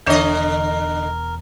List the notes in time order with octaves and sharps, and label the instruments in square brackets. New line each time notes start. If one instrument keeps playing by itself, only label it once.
[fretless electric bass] E1 E2 [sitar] D3 D#5 [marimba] E3 D4 C#5 [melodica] A#4